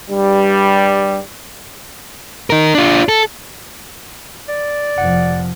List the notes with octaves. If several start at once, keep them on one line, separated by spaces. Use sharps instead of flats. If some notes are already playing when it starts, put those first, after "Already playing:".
G2 G3
D#4 A#4
D4 F4
A4
D5
F1 F3 F#5